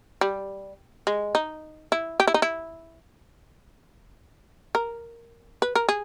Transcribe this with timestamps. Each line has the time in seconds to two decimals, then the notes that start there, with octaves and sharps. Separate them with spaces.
0.21 G3
1.07 G#3
1.35 D#4
1.92 E4
2.20 G4
2.27 E4
2.34 D#4
2.42 E4
4.75 A#4
5.62 B4
5.75 A#4
5.89 G#4